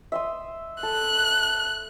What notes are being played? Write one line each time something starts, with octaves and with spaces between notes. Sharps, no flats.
E5 C6 D#6
A4 F#6